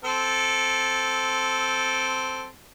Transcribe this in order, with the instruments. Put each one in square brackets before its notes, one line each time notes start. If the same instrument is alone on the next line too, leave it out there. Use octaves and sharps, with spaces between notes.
[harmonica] C4 A4